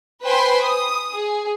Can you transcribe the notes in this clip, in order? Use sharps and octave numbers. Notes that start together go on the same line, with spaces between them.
B4 C5 G5 G#5 B5 C6
D#6
G#4